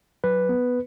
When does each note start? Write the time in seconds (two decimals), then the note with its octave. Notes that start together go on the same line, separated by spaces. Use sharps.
0.24 F#3 B4
0.49 B3